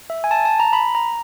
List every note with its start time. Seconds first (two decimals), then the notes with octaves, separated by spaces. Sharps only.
0.10 E5
0.24 G#5
0.31 A5
0.45 A5
0.60 A#5
0.73 B5
0.95 A#5